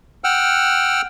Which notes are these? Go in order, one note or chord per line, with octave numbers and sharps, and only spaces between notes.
F#5 G5 E6 F6